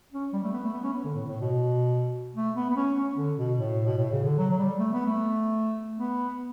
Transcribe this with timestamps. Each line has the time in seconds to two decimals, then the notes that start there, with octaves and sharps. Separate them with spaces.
0.13 C#4
0.33 G3
0.43 A3
0.53 B3
0.63 A3
0.73 B3
0.84 C#4
0.93 B3
1.04 D3
1.14 A2
1.27 A2
1.41 B2
2.36 A3
2.56 B3
2.70 B3
2.76 C#4
2.96 C#4
3.17 D3
3.37 B2
3.57 A2
3.86 B2
3.98 A2
4.11 C#3
4.24 D3
4.38 F#3
4.51 F#3
4.58 G3
4.79 A3
4.93 B3
5.06 A3
6.00 B3